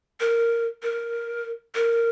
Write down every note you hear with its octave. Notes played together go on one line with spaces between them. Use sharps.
A#4
A#4
A#4